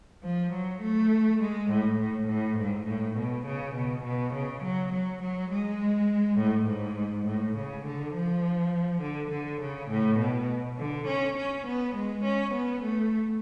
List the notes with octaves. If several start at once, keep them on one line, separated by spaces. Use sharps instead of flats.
F3
F#3
A3
G#3
A2
A2
A2
G#2
A2
B2
C#3
B2
B2
C#3
F#3
F#3
F#3
G#3
A2
G#2
A2
C#3
D3
F3
D3
D3
C#3
A2
B2
D3
C#4
C#4
B3
G#3
C#4
B3
A3